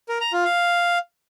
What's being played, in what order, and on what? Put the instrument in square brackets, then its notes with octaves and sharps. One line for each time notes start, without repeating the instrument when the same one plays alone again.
[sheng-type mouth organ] A#4
A#5
F4
F5